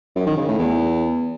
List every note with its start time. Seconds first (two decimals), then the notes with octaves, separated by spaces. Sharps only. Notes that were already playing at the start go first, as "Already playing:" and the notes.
0.16 F#2
0.26 D#3
0.37 C#3
0.48 A2
0.59 E2